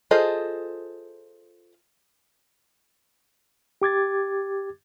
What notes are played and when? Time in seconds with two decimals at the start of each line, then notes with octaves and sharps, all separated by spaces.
0.11 F4 G#4 A4 C5 D#5
3.82 G4 D6 G#6 A6